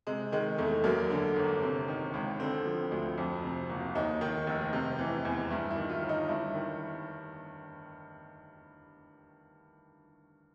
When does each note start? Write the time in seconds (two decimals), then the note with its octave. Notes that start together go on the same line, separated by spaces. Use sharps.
0.07 C3 G#3
0.32 D#3 G#3
0.58 E2 A3
0.84 F#2 A#3
1.10 D3
1.36 G1
1.62 C3
1.88 D#3
2.14 C#2
2.40 D3 C4
2.66 F3
2.92 D2
3.18 F2
3.44 C3
3.70 F#1
3.95 D#2 D#4
4.21 D#3
4.47 F1
4.73 C3
4.99 E3
5.25 E2
5.51 G2 E4
5.70 E4
5.76 D#3
5.90 F4
6.02 G1
6.09 D#4
6.28 G2 E4
6.55 D#3